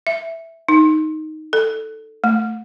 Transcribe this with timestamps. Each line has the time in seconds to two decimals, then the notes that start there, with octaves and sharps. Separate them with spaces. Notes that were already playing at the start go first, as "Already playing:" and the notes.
0.07 E5
0.68 D#4
1.53 A4
2.24 A3